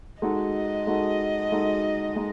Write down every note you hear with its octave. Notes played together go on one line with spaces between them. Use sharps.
G#3 D#4 F#4 A4 D#5
G#3 D#4 F#4 A4
G#3 D#4 F#4 A4
G#3 D#4